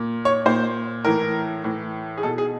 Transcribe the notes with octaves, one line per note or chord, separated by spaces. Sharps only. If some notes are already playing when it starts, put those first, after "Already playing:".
Already playing: A#2
C#5
A#2 C5
A2 E3 A#4
A2 E3
G#4
B2 A4
G#4